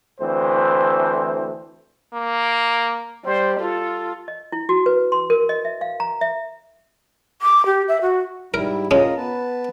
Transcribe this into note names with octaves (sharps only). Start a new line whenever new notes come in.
D2 E3 A3 C4 C5
A#3
G3 C5
F4 A4
D#5
E4
F#4
B4
C6
A#4
D#5
E5
F5
A#5
E5
D6
G4
E5
F#4
G#2 G3 E4 A#4
G#3 C#4 F4 A#4 D#5
B3 B4 A5